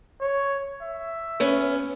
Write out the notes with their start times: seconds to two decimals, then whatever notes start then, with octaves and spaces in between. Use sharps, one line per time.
0.20 C#5
0.81 E5
1.40 B3 C#4